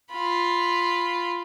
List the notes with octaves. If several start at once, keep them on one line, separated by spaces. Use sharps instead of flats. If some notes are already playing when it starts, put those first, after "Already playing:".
F4 B5